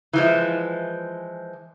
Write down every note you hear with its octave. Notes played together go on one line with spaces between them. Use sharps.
E3 F3 G#3